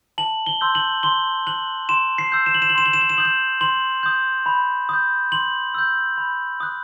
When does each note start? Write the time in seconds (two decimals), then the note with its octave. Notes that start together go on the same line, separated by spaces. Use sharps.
0.18 A5 F#7
0.47 G7
0.61 C6 E6 G6
0.75 F#7
1.03 C6 G7
1.47 F#6 F#7
1.89 C6 E7
2.18 C7
2.32 E6 G6
2.46 E7
2.54 F#7
2.62 E7
2.70 F#7
2.75 C6 E7
2.86 F#7
2.93 E7
3.01 F#7
3.10 E7
3.18 D#6 G6 F#7
3.25 E7
3.61 C6 F#7
4.03 D#6 G6
4.46 B5
4.89 D#6 G6
5.32 C6 F#7
5.74 E6 G6
6.18 B5
6.60 D#6 F#6